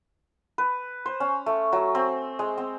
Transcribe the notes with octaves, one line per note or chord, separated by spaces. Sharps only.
B4
C5
C#4
A3
F#3
C4
G#3
C4